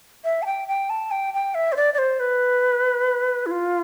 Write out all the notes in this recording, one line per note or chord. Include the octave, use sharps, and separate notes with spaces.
E5
A5
G5
G5
A5
G5
G5
E5
C5
D5
D5
C5
B4
E4
F4